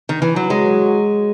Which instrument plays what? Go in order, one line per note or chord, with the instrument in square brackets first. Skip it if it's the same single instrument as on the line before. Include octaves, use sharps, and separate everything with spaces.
[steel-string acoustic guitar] D#3
E3
F#3
[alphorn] F#3 [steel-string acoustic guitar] G#3